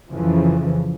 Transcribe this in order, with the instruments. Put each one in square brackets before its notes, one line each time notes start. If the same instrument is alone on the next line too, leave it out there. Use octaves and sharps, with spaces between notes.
[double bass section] F2 C#3 E3 F3